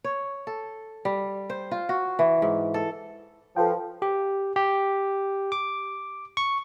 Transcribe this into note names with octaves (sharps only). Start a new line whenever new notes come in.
C#5
A4
G3
C5
F4
F#4
E3
G#2
A4
F3 A4 B4 G5
G4
G4
D6
C#6